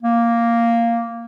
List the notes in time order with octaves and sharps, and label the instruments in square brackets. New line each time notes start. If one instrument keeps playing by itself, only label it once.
[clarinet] A#3